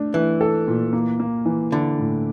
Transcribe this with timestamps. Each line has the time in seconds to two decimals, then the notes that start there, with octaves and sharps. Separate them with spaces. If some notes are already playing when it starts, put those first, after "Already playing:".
Already playing: A3 D4
0.14 E3 A3
0.41 A4
0.68 A#2
0.93 A#3
1.20 A#3
1.45 E3
1.72 D3 E4
1.99 A2